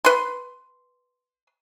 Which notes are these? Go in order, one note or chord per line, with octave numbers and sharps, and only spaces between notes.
B4 C6